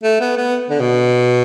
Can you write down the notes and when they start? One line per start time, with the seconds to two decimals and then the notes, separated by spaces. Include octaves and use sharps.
0.03 A3
0.21 B3
0.37 B3
0.70 D3
0.80 B2